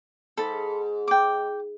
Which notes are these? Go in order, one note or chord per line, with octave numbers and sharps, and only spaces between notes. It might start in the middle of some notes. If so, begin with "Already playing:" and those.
G#2 A4 B5
G5 D6